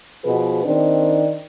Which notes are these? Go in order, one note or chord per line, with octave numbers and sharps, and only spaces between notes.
B2 F3 G#4 B4
D#3 C4 D4